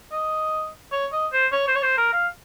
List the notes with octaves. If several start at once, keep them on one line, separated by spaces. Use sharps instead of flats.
D#5
C#5
D#5
C5
C#5
C5
C#5
C5
A#4
F5